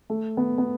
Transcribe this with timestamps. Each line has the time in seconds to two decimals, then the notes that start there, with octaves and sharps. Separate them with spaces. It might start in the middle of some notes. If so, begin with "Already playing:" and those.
0.10 A3
0.37 B3
0.58 B3